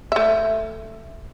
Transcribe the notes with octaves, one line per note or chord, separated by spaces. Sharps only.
A3 E5